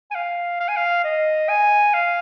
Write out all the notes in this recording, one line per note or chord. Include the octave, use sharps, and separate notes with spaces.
G#5
F5
F5
G#5
F5
D#5
G#5
F5